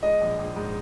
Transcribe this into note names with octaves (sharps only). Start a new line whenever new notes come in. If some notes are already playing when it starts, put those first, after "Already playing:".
G#3 D#5
A#1
A#1
G#2